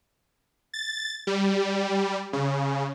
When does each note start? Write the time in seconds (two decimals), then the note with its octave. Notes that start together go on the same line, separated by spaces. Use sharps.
0.74 A6
1.27 G3
2.33 C#3